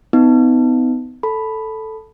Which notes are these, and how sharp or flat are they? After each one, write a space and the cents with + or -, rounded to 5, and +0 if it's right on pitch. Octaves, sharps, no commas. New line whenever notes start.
B3 +40 D#4 +25
A4 +0 B5 +0